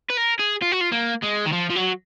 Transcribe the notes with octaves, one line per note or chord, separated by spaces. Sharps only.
B4
A#4
G#4
F4
F#4
F4
A#3
G#3
D#3
F3
F3
F#3